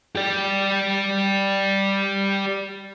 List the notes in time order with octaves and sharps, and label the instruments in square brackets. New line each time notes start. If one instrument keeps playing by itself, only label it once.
[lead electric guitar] G4 D5